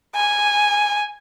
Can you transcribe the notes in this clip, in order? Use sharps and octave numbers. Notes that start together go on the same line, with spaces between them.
G#5